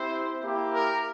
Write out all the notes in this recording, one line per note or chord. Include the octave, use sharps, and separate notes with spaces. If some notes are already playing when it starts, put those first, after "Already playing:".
Already playing: C4 E4 G4 C5
A#3 E4 G4
A#4